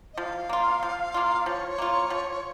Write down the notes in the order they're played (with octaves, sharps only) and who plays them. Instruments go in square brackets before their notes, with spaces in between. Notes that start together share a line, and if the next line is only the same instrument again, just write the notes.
[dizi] D#5
[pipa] F3 [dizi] F5
[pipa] A#3 F4
F3
A#3 F4
[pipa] F3 [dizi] C#5
[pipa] A#3 F4
F3